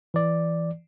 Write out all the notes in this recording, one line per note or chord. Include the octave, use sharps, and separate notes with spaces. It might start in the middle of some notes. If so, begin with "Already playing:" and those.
E3 D5